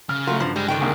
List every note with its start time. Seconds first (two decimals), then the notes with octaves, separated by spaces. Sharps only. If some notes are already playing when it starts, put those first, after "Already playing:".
0.09 C#3 F6
0.27 F#3 A3 F4
0.40 G2 F3
0.56 G3 G#3
0.68 C#2 D3 D#3 G5
0.81 C2 A#3 G#4